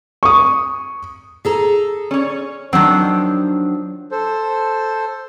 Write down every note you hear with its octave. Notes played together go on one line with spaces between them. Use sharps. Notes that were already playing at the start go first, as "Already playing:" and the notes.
C#6 D#6
G#4 A4 A#5
C#4 C#5
D#3 F3 F#3 C4 D4
A4 C5